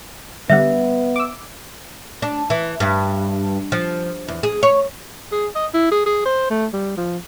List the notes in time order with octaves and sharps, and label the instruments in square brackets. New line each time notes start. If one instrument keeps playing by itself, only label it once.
[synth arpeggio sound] D3 G3 F#5 [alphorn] B3 [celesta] E5
[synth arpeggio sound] D6 E6
[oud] D4
E3
G2
F3
E2
G#4
C#5
[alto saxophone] G#4
D#5
E4
G#4
G#4
C5
A3
G3
F3